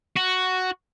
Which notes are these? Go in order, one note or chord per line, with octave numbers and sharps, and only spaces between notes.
F#4